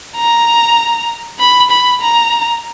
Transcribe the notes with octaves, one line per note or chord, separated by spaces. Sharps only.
A#5
B5
B5
A#5